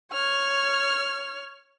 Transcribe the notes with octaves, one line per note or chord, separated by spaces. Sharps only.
C#5 F6